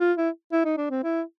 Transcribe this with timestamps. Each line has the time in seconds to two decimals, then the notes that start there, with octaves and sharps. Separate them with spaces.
0.01 F4
0.17 E4
0.53 E4
0.65 D#4
0.78 D4
0.91 C4
1.04 E4